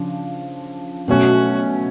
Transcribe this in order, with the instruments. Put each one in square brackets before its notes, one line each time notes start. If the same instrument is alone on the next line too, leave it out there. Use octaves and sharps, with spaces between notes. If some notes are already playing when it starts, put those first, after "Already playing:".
Already playing: [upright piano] C#3 F3 D4
[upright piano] B2 F#3 A3 C#4 [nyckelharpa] F#4